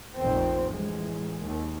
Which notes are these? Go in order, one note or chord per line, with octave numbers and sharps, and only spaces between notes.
F1 A#1 F2 C4
A1 G#3
D#2